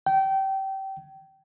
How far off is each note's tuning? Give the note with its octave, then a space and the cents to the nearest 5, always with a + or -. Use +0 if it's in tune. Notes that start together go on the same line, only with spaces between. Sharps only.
G5 -25